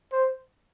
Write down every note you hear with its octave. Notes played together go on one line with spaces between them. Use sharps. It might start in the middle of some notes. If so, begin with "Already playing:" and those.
C5